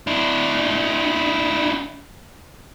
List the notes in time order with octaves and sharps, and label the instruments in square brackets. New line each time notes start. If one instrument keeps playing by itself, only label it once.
[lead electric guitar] D4 E4